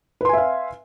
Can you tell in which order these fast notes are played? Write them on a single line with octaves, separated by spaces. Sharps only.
B4 C6 G#5 E5 F5